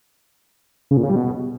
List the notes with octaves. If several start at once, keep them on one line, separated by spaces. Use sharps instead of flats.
C#3
A#2
C#3
G3
B2